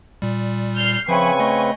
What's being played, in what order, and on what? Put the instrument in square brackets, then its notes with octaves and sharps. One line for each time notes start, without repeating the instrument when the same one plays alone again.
[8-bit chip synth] A#2 G3
[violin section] F6 G6 C7
[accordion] C#3 C4 B4 [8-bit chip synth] F3 E5 B5 [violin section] G#5 C#6
[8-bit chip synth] A3 D#5